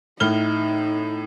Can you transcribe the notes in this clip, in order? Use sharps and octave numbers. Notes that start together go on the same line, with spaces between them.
A2 D#4 F6 G7